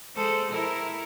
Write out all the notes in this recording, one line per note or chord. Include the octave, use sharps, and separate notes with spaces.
G#3 A4 C5
E4 A#4